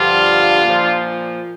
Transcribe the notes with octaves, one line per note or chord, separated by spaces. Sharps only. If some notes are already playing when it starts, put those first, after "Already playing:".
Already playing: G2 D3 F3 D4 F4
A#2 F3